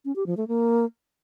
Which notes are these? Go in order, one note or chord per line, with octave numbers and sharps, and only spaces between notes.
C#4
G4
F3
A3
A#3